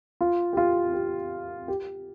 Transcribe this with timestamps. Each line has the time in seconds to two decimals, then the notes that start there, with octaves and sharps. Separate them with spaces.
0.21 F4
0.53 G4
0.57 F4
0.94 G4
1.68 G4